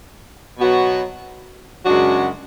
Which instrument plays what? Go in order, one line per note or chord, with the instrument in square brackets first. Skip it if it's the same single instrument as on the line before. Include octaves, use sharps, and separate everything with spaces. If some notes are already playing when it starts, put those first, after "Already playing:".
[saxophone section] B2 F#3 B3 F#4
F#2 C#3 G#3 D4 F#4